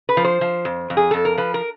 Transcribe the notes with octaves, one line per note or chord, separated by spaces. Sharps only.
B4
F3
C5
F3
F2
F2
G#4
F2 A4
A#4
F3 B4
A#4